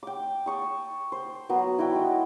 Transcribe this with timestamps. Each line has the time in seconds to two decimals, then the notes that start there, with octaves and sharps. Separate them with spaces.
0.03 G5 D6
0.46 A5 C#6 D#6
1.12 C5
1.49 F#3 B3
1.78 E4 F#4 D5 G5
1.95 G#3